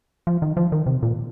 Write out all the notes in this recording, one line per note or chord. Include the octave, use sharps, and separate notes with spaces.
F3
D#3
F3
D#3
C3
A#2